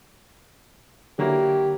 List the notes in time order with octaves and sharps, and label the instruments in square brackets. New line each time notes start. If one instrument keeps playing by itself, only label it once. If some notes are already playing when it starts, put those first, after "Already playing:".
[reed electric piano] D3 [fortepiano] F#3 A#3 E4 [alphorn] G4